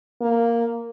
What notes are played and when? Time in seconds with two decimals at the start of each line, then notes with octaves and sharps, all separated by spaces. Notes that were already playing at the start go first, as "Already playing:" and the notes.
0.21 A#3